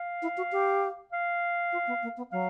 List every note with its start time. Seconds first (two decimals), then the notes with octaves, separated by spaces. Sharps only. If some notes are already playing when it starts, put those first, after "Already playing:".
Already playing: F5
0.22 E4
0.37 F#4
0.52 G4
1.12 F5
1.72 F4
1.87 B3
2.03 A#3
2.17 B3
2.32 F#3 F5